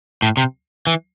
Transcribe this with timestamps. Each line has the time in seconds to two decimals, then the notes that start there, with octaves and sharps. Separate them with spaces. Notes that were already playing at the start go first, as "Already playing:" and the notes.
0.22 A2
0.37 C3
0.87 E3